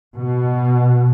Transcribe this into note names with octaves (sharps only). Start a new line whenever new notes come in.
B2